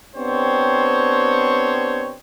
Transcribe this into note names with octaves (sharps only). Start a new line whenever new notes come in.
B3 C4 D4 G4 C5 C#5